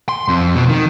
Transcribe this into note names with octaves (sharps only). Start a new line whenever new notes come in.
C6
F2
B2
D#3